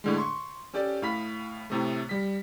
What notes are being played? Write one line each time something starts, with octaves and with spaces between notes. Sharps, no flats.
A2 D3 G#3
C6 C#6
C#4 G4 A4 D5
A2 F5 B5 B6
A2 C3 A3
G3 B6